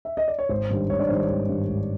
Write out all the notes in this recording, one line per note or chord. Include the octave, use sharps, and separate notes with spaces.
E5
D#5
D5
C#5
G#1 C5
G2 D#3 G3
G#1 C#5
D4 D5
G2 D#3 G3 C5
C#5
G#1
G2 D#3 G3
G#1